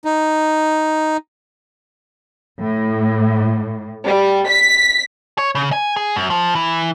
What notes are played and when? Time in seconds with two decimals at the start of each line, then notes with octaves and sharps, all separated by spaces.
0.05 D#4
2.61 A2
4.06 G3
4.48 B6
5.38 C#5
5.55 C#3
5.72 G#5
5.96 G#4
6.16 F#2
6.31 F3
6.55 E3